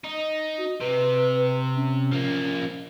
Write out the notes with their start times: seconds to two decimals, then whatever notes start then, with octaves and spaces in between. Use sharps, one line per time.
0.04 D#4
0.58 F#4
0.80 C3 B4
1.76 C#4
2.12 F3 A#3